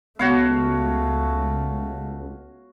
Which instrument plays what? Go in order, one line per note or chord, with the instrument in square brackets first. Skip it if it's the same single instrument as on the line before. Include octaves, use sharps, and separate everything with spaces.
[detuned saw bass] C#2 [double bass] A3 [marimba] B3 [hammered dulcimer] F#4 C#5 F5